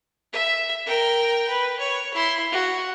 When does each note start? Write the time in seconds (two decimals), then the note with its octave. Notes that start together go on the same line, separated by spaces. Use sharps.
0.33 E5
0.86 A#4 G5
1.49 B4
1.79 C#5
2.14 E4 C6
2.52 F#4